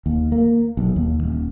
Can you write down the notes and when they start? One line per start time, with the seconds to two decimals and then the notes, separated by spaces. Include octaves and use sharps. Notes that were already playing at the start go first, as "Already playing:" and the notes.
0.06 D#2
0.32 A#3
0.77 B1
0.96 D#2
1.23 D#1